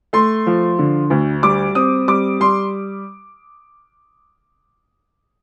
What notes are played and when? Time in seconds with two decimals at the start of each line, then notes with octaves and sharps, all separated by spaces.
0.13 A3 C6
0.47 F3
0.79 D3
1.10 D2
1.43 G3 D6
1.75 C4 D#6
2.08 G3 D6
2.40 G3 C6